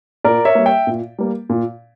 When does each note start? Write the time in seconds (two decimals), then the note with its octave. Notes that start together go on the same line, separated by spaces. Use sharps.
0.24 A#2 A#4 D5
0.45 C#5 E5
0.55 G3 A#3
0.66 E5 G5
0.87 A#2
1.18 G3 A#3
1.49 A#2